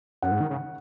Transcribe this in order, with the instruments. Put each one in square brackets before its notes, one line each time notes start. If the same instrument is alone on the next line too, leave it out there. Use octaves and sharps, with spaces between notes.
[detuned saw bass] F#2 [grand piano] F#5
[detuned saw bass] G#2
D#3
C#3